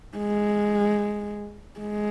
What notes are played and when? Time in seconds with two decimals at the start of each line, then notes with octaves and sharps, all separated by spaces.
0.17 G#3
1.80 G#3